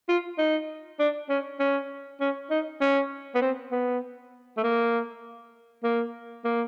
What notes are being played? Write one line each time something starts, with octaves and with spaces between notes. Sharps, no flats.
F4
D#4
D4
C#4
C#4
C#4
D#4
C#4
B3
C4
B3
A3
A#3
A#3
A#3